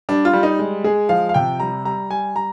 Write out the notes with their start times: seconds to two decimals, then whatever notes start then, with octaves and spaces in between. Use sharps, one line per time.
0.09 G3 D4
0.25 F4
0.33 G3
0.43 D#4
0.59 G#3
0.84 G#3 G#4
1.09 F3 F5
1.29 F5
1.34 C3 G5
1.60 G3 A#5
1.85 G3 A#5
2.10 G3 G#5
2.35 G3 A#5